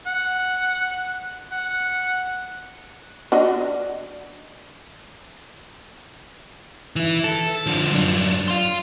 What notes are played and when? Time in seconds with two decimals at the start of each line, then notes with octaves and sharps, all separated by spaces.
0.06 F#5
1.52 F#5
3.32 D4 F#4 D#5
6.96 E3 E4
7.24 A4
7.66 D3 F3
7.92 F#2 D4
8.48 F5 C6